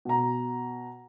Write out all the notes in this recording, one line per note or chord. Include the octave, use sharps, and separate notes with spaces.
B2 A#5